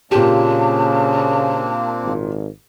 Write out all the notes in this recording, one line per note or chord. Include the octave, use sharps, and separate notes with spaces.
A#2 C#3 A#3 C4 D4 G4 A5
G#1